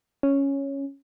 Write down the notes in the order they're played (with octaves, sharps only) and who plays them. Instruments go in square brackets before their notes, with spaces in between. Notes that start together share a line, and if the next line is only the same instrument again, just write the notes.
[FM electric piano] C#4